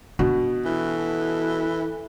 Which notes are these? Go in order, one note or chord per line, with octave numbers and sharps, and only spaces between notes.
B2 D4
E3 A4